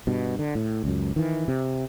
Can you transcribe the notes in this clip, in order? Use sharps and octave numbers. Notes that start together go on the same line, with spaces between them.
G2 B2
D3
A2
C#2 F#2
D#3 E3
C3